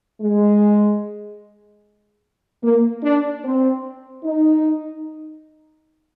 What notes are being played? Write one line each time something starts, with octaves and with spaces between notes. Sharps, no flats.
G#3
A#3
D4
C4
D#4